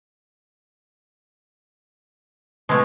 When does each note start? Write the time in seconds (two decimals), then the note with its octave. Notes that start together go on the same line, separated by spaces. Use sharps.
2.69 B2 G#3 A3 B3